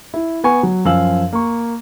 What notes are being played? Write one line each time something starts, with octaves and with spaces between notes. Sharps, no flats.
E4
B3 G#5 C#6
F#3
F#2 F3 F5 G#5 E6 F#7
A#3 C#6